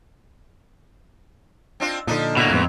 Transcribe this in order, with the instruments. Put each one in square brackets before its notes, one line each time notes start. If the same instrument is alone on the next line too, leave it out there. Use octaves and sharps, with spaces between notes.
[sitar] C4 D4 F4
[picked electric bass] A#2 D3 [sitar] F3 D4 D#4
[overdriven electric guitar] B2 A#3 [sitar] F#3 E4 E5
[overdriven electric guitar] F2 [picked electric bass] A2 G#3 B3